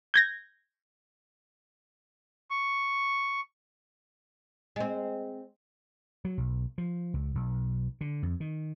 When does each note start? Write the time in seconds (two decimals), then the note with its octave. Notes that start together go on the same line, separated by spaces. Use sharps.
0.14 G6 G#6 A#6
2.51 C#6
4.76 G#3 C4
6.25 F#3
6.38 B1
6.78 F3
7.14 C#2
7.35 B1
8.01 D3
8.23 F2
8.40 D#3